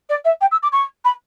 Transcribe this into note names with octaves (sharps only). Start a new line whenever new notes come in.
D5
E5
G5
E6
D6
C#6
B5